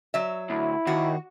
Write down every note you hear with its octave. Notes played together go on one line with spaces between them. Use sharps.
F#3 E5
D2 E4
D#2 F#4